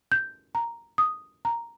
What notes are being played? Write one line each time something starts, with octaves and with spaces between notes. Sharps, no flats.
G6
A#5
D#6
A#5